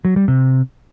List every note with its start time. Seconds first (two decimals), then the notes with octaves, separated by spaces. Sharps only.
0.05 F#3
0.16 G3
0.28 C3